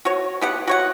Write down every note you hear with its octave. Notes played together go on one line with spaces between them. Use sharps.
F#4 C#5
B3 G4 F#5
F#4 C#5 F#5